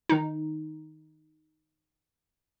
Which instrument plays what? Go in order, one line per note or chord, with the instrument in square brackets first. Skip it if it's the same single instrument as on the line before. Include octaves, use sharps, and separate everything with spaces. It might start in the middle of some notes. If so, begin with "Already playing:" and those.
[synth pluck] D#3 D#4